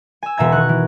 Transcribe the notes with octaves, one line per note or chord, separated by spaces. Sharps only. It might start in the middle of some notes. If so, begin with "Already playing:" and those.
G#5 E6
E1 B2 E5 A#5 G#6
D#3 C#6 F#6
E3